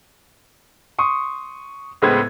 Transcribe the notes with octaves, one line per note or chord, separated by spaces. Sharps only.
C6 C#6 D#6
C#2 A2 G#3 B3 C5 G#6